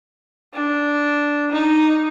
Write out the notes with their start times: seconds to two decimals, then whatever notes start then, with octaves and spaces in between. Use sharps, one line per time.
0.53 D4
1.52 D#4